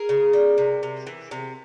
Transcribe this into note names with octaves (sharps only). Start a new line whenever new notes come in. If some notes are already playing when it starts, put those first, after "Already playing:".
Already playing: G#4 A#4
C#3
G3
C3
C3
E3
C3